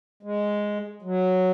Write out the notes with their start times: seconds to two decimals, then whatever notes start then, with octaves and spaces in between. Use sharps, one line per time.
0.23 G#3
1.02 F#3